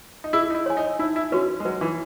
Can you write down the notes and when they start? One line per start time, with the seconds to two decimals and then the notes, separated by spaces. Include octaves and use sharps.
0.24 D#4
0.33 E4 G#4
0.50 D#4
0.55 E4
0.66 C#5 G#5
0.77 D#4
0.99 D#4 E4
1.16 E4
1.32 C#4 F#4 B4
1.60 G#3
1.65 F#3 B4
1.81 E3